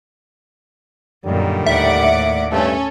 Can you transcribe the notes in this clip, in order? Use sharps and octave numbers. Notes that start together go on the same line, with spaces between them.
F#2 A#2 D3 D#3 G3
D#2 A2 D5 E5 F#5 D6
G2 A3 C#4 A4